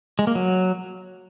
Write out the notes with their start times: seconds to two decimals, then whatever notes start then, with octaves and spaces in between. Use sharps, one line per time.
0.19 G#3
0.27 A#3
0.35 F#3